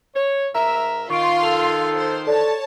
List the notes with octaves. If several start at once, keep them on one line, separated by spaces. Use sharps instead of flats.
C#5
G#2 A#4 E5 A#5
D#3 F4 F5 C6 C#6 D7
A4 F7
C5
A4 C#5 D5 A5